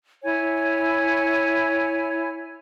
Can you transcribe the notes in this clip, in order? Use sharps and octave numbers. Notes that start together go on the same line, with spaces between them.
E4 C#5 G#5